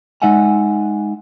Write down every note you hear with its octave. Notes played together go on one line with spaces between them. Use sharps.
G#3 D#4 D5 E5 F#5 G#5